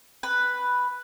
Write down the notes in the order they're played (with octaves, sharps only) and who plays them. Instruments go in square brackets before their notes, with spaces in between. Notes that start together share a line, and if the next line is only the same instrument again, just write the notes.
[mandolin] B4